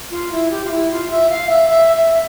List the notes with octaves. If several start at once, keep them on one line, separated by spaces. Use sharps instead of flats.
F4
E4
G4
F4
E4
F4
E5
F5
E5
E5
E5